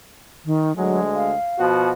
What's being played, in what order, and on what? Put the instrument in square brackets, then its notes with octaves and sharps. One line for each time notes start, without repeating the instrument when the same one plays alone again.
[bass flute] D#3
[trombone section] D2 G#3 [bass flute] F#3
[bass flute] F5
[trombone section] B2 F3 F#4